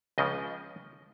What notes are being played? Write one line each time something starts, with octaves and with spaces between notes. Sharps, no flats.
C#2 C#3 F3 D#5